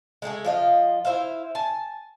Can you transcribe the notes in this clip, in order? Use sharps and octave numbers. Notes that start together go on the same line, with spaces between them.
G#3 A3 G4 G#4
F3 F4 D#5
E4 C5 E5 F5
G#5 A5